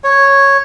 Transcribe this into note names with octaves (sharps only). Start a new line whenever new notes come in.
C#5